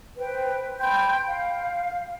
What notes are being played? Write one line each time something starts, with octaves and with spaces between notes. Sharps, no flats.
B4 C5 G5
G5 B5 C6 G6
F5